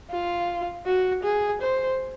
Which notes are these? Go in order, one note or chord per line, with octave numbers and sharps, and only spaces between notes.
F4
F#4
G#4
C5